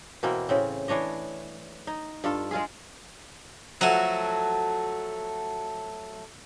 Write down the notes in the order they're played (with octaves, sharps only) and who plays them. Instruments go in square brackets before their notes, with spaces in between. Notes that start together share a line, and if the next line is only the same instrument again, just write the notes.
[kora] B2 E3 A#3 C4
A2 C#3 C4
E3 D4 C#5 D#5
D#4
G2 F4 A4
G#3 F4 G#4
[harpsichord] F3 F#4 G#5 [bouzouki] F#3 A3